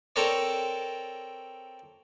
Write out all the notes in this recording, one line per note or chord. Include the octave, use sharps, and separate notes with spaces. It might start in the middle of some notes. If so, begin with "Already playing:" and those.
C4 A4 A#4 C#5 D5